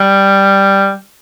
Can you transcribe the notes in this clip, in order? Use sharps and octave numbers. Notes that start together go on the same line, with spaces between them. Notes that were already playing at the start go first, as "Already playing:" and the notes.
Already playing: G3